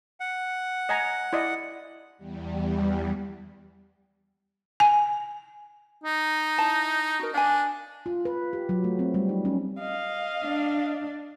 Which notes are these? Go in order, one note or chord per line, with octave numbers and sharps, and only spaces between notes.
F#5
D#5 G#5 A#5
E4 D5 D#5
E2 G3
G#5
D#4
E4 A5
F#4 A#4
D4 F5 G#5
F4
B4
G4
F#3
A3
C4
G3
D#4
C#4
D#5 F5
D4